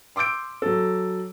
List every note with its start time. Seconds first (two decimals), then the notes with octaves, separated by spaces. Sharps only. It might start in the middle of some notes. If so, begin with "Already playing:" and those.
0.16 C6 D6 E6 G6 D7
0.62 F#3 A4